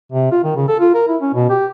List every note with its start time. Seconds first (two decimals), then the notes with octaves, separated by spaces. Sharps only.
0.12 C3
0.32 F4
0.44 D#3
0.56 C#3
0.68 A4
0.80 F4
0.94 A#4
1.08 E4
1.21 C#4
1.34 B2
1.50 G4